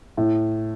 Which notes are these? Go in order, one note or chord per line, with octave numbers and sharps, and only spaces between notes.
A2